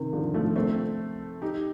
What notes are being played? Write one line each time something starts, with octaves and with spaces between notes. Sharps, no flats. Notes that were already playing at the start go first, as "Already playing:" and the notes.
Already playing: C3 D#3
D3 F3
F3 A3
A3 C4
D#4 G4